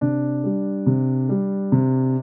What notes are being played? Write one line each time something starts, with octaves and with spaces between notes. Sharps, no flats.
C3 D4
G3
C3
G3
C3